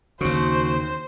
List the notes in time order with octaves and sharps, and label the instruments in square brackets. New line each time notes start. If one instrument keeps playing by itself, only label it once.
[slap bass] D#2 C#3 [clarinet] F#4 [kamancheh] C5